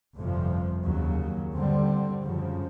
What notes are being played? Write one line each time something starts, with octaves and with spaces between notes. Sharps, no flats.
G1 F2 C3 F3
D#2 C#3 F#3
G2 D3 G3 C4
F#2 C#3 F3